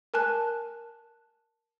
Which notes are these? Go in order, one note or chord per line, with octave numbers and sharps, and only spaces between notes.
A#4 G#5 A5 F#6